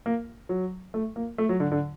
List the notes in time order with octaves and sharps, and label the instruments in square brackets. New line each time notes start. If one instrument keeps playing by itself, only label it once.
[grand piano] A#3
F#3
A3
A#3
A3
F#3
D3
D3